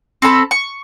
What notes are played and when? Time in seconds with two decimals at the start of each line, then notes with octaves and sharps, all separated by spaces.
0.22 C4 A4 A#5 B5
0.51 C#6